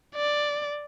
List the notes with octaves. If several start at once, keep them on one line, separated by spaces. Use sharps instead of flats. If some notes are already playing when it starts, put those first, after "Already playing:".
D5